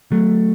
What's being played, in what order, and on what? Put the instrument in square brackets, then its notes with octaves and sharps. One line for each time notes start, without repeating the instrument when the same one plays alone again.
[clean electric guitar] F#3 A3